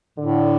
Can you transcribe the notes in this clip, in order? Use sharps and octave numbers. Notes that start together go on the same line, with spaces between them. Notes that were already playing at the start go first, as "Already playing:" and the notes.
A2 D3